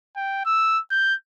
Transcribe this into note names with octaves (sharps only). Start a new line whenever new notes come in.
G5
E6
G6